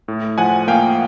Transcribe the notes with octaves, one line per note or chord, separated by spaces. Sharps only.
A2
F3 F#5 G#5
A#3 F5 G5